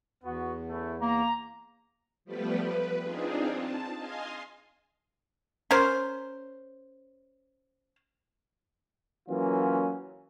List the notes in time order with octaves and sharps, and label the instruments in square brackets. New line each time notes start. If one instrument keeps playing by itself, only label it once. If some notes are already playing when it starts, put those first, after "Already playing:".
[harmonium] E2 [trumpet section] B3 F#4
[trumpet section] A3 C#4 E4
[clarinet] A#3 [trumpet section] A#5
[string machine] F3 G3 A3 B3 G4 B4
B4
C4 D4 D#4 F4 G#4
A5
D#5 F5 G#5 C6
[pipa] C#4 A#4 C5
[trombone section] E3 F#3 A#3 C#4 F4